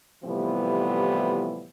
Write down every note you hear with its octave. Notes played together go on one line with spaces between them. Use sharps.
A2 C3 E3 F3 G3 B3